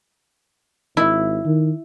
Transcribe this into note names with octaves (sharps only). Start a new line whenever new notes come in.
G#1 E4
D#3